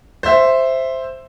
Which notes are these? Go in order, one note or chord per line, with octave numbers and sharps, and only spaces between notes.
C5 E5